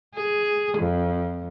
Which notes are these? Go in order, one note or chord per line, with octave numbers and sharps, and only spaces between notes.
G#4
F2